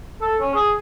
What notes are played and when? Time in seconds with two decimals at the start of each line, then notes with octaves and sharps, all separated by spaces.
0.22 A4
0.41 C#4
0.54 G#4